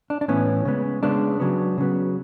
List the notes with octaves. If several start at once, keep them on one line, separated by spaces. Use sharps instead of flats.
D4
D4
A2 E3 B3 C#4
C#3 G#3 B3
C#3 G#3 B3 D4
C#3 F#3 B3
C#3 F#3 B3